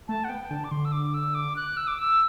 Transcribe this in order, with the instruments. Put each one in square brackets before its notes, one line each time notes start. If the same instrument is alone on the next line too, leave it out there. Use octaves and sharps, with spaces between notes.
[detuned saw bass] A3 [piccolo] A5
[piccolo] F#5
[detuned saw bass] B3 [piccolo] G5
[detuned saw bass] D3 [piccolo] A5
[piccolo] D6
[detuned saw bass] D3 [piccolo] C6
[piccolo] E6
D6
E6
D6
F#6
E6
D6
E6